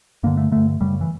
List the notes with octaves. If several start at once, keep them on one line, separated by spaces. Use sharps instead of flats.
G2 D3 A#3
A3
G2 D3 A3
F#2 C#3 G3
E3